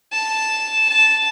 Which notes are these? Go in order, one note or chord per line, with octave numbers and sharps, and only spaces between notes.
A5
A5